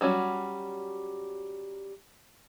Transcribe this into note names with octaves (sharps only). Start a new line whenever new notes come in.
F#3 G3 C#4 F#4